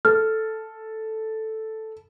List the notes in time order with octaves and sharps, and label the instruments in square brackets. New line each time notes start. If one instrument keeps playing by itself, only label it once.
[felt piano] A4 [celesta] F6